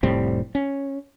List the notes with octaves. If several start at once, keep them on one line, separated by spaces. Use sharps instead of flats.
F1 A2 G3 C4
C#4